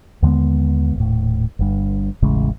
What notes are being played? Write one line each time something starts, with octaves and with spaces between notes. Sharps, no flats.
D#2 D3 G#3 B3
D#1 A2
G1 G2
E1 A1 C#3 G#3